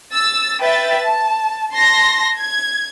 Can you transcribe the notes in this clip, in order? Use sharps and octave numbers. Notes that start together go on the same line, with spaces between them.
E6 A6
B4 E5 G5 A6
A5
A5 C6 A#6
G#6